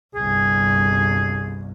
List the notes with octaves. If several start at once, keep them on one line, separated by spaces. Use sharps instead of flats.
G1 C2 G#4